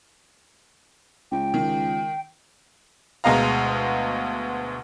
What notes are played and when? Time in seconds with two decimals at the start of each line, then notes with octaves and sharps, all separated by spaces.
1.31 C#2 G5
1.54 D#3
3.24 D2 B2 G#3 D#5 F5 A#5